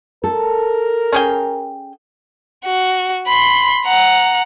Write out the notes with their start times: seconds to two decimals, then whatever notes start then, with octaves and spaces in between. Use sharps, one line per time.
0.24 A4 A#4
1.13 C#4 G#4 G5
2.65 F#4
3.27 B5 C6
3.85 F#5 A#5